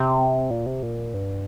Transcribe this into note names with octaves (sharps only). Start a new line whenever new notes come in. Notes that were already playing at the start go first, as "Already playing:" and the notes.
Already playing: C3
A#2
C3
A#2
G2